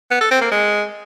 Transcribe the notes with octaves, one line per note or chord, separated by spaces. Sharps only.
B3
A4
C4
A#3
G#3